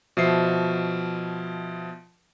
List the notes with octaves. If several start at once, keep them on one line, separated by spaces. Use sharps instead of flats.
B2 F3 E5 C7